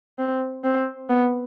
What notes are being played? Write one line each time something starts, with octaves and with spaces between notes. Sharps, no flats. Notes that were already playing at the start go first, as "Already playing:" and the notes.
C4
C4
B3